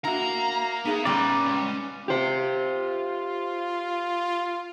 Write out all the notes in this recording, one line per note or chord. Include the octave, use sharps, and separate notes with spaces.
E4 F#4 A#4 F5 A#5
B3 D#4 G#4 E5
A#2 G3 C#4 B4 D5 C6
C#2
F4 G4 C5